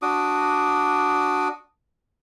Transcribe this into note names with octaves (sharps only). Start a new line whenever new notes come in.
D4 F#4 D6 D#6